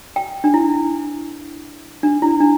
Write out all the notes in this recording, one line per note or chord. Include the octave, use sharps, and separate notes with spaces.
G5
D4
E4
D4
E4
D4